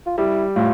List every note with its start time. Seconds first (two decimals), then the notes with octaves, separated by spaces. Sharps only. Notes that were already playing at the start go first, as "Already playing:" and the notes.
0.06 F4
0.18 G3 E4
0.56 A2 F4